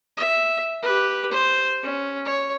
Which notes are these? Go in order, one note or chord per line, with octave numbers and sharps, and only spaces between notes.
E5
G4 B4
C5
C#4
C#5